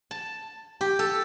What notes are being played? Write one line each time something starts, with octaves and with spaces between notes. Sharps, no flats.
A5
G4
A4